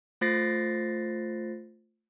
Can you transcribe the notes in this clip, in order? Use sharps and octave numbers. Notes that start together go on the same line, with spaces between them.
A3 F4 C5 A6 A#6 C7